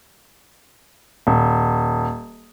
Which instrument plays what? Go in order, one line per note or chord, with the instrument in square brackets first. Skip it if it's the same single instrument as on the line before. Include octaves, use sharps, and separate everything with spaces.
[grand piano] D#1